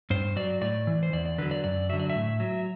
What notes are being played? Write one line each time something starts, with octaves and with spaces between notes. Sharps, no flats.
G2 C5
F#3 D5
A2 D5
E3
C5
E2 D5
D5
D3 F#3 B4
D5
F#2 D5
D3 F#3 E5
D5
E5
A2
F#3